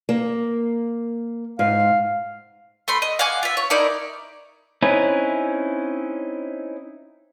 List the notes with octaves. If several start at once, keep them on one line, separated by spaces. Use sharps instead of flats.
A#3
G#2 F5
A3 B5 C6
D#5
F5 F#5 G#5 D6
F4 E5
C#5
D#4 E4 A#4 D5
C4 C#4 D#4 E4 B4